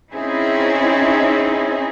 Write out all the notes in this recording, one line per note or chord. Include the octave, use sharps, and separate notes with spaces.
C4 C#4 D#4 E4 G#4